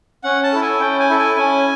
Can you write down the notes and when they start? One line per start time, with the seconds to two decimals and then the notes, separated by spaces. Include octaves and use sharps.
0.24 C#4 F#5
0.43 A5
0.53 E4 A4
0.62 G#5
0.80 C#4 G5
1.00 G#5
1.09 E4 A4
1.19 G#5
1.37 C#4 G#5